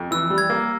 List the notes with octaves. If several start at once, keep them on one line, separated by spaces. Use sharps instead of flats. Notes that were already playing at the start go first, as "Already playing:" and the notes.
Already playing: F2
E3 E6
G3
G#6
A#3